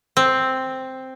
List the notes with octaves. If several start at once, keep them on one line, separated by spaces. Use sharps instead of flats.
C4